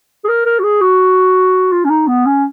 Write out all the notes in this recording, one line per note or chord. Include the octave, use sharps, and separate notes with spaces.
G#4
A#4
A#4
F#4
G#4
F#4
F4
C#4
D#4
B3
C#4